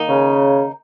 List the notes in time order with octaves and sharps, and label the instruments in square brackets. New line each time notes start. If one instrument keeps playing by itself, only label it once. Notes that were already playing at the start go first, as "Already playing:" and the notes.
Already playing: [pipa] D#3 A#3 D#4
[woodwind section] C#3